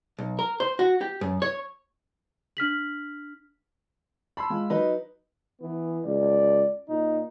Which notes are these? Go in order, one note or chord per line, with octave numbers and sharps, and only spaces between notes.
B1
A#4
C5
F#4
G4
F#2
C#5
D4 F6 B6 F#7
A5 B5 C6 E6
G#3 F4
F#3 D#4 B4
E3 B3
C#2 D5
A#2 D#4